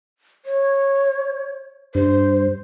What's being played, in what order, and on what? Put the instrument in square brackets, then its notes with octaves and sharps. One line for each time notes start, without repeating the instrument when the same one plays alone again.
[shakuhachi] C#5
[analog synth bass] G2 [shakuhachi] C5